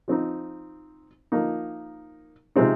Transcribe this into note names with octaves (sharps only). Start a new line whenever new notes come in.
F3 C4 D#4
F3 A#3 D#4
C3 F3 G#3 C4 D#4